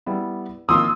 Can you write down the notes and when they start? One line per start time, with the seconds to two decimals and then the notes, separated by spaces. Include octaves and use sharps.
0.06 G3 B3 E4
0.69 D#3 F3 A#3 C6 D#6 E6